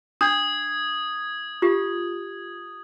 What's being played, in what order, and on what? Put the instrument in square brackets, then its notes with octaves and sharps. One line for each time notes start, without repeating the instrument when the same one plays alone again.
[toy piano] D4 [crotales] D#6 G#6
[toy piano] F4 G4